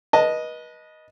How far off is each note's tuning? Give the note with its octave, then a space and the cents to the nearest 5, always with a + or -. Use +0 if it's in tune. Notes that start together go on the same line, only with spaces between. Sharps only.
B4 -30 D#5 +0 A5 +0